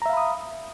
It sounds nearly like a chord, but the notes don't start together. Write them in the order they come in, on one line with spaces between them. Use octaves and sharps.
A#5 E5 F5 B5 D#6